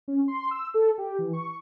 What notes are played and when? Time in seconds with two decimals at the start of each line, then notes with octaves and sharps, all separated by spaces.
0.08 C#4
0.28 C6
0.51 E6
0.74 A4
0.98 G4
1.18 E3
1.33 C#6